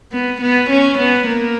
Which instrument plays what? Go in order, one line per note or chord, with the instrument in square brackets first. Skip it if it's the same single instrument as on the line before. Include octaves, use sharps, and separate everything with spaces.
[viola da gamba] B3
B3
C#4
B3
A#3